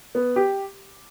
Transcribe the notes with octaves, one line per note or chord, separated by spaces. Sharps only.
B3
G4